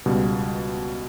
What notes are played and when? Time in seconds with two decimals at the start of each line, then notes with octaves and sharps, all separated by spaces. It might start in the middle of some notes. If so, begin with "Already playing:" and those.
0.06 C#2 B2 G3